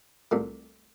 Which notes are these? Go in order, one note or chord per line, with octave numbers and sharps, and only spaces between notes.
C2 A#2 A3